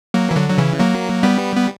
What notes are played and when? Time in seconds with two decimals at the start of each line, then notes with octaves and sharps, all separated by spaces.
0.14 F#3 A#3
0.31 E3
0.36 D3 F#3
0.49 F#3
0.58 C#3 E3
0.80 F#3 A#3
1.23 G3 B3
1.56 B3